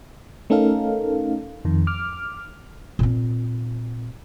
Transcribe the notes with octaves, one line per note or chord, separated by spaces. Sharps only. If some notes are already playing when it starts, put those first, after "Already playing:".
A3 C#4 D#4 A4 A#4 F5
F2 D#3
D6 F6
A#2 C4